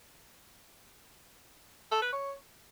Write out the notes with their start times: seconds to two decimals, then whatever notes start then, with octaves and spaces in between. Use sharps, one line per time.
1.91 A4
2.02 B4
2.13 C#5